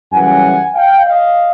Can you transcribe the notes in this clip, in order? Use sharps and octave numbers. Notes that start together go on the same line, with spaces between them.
F#2 C#3 E3 G3 F#5 G#5
F5 G5
D#5 F5